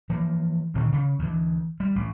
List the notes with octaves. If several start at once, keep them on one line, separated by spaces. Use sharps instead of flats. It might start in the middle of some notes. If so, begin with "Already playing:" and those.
E3 F3 A#3
D2 A#2 D#3 C4
C#3
D2 E3
G3
A1